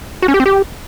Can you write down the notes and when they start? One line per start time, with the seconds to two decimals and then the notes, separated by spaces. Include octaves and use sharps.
0.22 F#4
0.28 C#4
0.34 G4
0.40 C4
0.46 G4